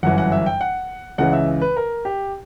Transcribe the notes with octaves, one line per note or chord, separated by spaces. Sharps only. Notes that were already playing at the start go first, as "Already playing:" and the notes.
G1 F#2 E3 F#5
F#5
E5
G5
F#5
C#2 C#3 E3 F#5
E5
B4
A#4
G4